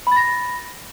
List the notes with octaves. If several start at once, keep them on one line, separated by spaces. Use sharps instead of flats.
B5 A6 A#6